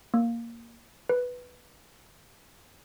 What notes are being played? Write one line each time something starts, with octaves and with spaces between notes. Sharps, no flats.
A#3
B4